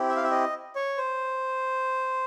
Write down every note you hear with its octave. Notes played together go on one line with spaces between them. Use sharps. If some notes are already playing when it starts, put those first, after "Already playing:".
Already playing: C4 E4 G4
E5
F5
E5
D#5
C#5
C5